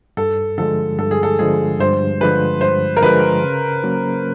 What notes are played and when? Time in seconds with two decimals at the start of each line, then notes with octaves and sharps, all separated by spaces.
0.17 G2 A4
0.58 D3 F3 G#3 A4
0.98 G2 A4
1.11 G#4
1.23 A4
1.39 D3 F3 G#3 G#4
1.80 G2 C5
2.21 D3 F3 G#3 B4
2.61 G2 C5
2.97 A#4
3.03 D3 F3 G#3 B4
3.43 C#3
3.84 F#3 A#3 C#4